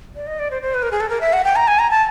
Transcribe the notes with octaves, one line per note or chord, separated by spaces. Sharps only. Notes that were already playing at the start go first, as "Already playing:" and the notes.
D5
D#5
D5
C5
C5
B4
A#4
G#4
A4
A#4
E5
F#5
G5
A#5
G#5
A#5
A5